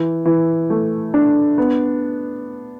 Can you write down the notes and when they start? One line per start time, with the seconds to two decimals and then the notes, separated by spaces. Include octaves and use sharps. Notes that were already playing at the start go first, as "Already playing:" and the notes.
Already playing: E3
0.25 E3
0.70 A3
1.14 D4
1.58 B3